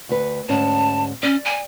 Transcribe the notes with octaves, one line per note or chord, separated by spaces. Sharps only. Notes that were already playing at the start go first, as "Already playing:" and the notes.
D2 B4
D2 G#2 C#4 A5
C#4 D5
G#5